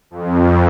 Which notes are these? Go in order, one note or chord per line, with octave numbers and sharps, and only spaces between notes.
F2